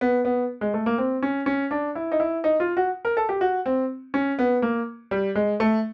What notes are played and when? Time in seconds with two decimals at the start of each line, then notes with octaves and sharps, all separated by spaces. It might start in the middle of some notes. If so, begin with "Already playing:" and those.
0.01 B3
0.25 B3
0.61 G#3
0.74 A3
0.86 A#3
0.98 C4
1.23 C#4
1.46 C#4
1.71 D4
1.95 E4
2.12 D#4
2.20 E4
2.44 D#4
2.60 F4
2.77 F#4
3.05 A#4
3.17 A4
3.29 G4
3.41 F#4
3.66 C4
4.14 C#4
4.39 B3
4.62 A#3
5.11 G3
5.35 G#3
5.60 A3